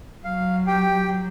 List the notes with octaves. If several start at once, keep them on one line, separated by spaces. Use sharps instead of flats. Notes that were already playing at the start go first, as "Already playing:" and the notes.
F#3 F5
G4 G5